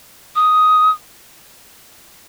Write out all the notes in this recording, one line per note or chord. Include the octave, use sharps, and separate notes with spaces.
D#6